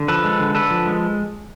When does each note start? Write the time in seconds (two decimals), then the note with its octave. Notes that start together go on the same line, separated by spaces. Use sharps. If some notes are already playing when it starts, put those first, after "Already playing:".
Already playing: D3
0.08 F3 A4 B4
0.24 G#3
0.40 D3
0.55 D3 A4 B4
0.71 F3
0.86 G#3